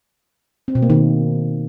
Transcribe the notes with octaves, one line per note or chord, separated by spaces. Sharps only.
C4
B2
A#3
D#3